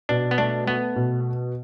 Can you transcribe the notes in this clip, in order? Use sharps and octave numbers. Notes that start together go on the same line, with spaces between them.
B2 D4
B3
A3 D4
A3 B3
B2